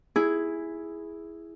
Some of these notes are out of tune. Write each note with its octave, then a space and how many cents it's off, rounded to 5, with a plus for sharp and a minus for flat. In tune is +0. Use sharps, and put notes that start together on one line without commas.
E4 +0 G#4 +0